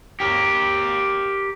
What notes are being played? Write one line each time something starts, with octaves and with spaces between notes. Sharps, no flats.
G4 A#4